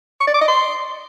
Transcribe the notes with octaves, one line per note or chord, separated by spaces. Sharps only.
C#6
D5
D6
D#5
C6